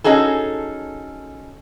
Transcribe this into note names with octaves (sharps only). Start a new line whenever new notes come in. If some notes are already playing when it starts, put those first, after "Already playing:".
C#4 D#4 F#4 G#4 A4